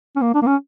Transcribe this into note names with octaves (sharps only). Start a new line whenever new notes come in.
C#4
A#3
D4
A#3
C#4